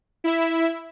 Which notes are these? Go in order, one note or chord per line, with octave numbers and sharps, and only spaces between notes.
E4 E5